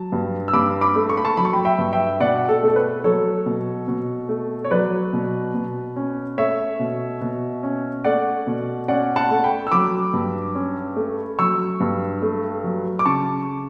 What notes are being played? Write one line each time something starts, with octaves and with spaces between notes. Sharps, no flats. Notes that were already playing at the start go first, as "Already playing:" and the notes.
Already playing: F#3 A5
G2
E6
G2 B5 D6
B5 D6
A3
C#6
B5
A5 C#6
F#3 B5
C#6
G5 B5
E5 G5
G2
E5 G5
B2 D5 F#5
A4
A3 A4
B4
F#3 A4 C#5
B2
B2
A3
C#5
F#3 B4 D5
B2
B2
C#4
A3 C#5 E5
B2
B2
C#4
A3 D5 F#5
B2
C#4 D5 F#5
F#5 A5
A3
G5 B5
E6
F#3 B5 D6
G2
C#4
A3
F#3 C#6 E6
G2
A3
F#3
D6
C#3 A5 C#6